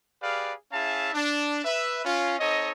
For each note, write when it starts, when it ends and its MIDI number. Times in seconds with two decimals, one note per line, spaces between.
0.21 0.54 67
0.21 0.54 68
0.21 0.54 71
0.21 0.54 74
0.21 0.54 77
0.72 1.13 61
0.72 1.13 64
0.72 1.13 68
0.72 1.13 76
0.72 1.13 77
0.72 1.13 81
1.13 1.63 62
1.65 2.04 71
1.65 2.04 76
2.05 2.38 61
2.05 2.38 65
2.39 2.71 60
2.39 2.71 63
2.39 2.71 69
2.39 2.71 73
2.39 2.71 75